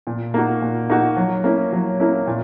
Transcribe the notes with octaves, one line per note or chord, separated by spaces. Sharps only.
A#2
A#3 D#4 F#4
A#2
A#3 D#4 F#4
F#3
A#3 C#4 E4
F#3
A#3 C#4 E4
A#2